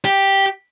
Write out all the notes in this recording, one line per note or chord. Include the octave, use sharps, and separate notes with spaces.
G4